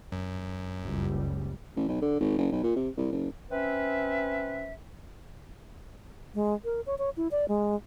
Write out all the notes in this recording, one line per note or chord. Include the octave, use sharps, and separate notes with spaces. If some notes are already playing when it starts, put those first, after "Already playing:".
F#2
F#1 C#2 G3
A1
B1
D3
G#1
F#1
B1
A#2
C3
C2
F#1
C4 C#4 B4 E5
G#3
A#4
C#5
C#5
E4
D5
G#3